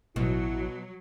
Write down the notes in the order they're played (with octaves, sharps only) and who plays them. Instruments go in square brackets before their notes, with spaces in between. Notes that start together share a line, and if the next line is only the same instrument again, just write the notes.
[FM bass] A1 [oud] B2 [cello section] F#3 [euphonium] E4